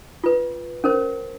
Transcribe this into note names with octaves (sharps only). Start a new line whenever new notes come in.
F4 B4
C#4 A#4 C5